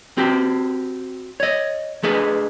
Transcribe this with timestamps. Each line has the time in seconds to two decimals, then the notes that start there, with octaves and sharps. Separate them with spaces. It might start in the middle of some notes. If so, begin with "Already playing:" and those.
0.17 C4 F#4 G4
1.40 C#5 D#5
2.03 A3 D4 G#4 B4 D#5